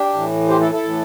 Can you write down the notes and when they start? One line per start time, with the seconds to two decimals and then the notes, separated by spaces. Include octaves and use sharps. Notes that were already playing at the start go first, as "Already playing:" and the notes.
Already playing: D4 G4
0.13 A2 E3
0.49 G4 C5
0.61 E4 A4
0.72 E4 A4
0.83 A2 E3